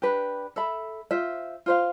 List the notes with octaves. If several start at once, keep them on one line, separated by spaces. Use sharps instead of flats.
D4 G4 B4
A4 E5 B5
F4 C5 E5
F4 C5 F5